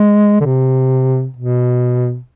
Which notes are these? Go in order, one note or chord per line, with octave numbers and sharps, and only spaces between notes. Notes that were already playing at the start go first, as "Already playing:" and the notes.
Already playing: G#3
D3
C3
B2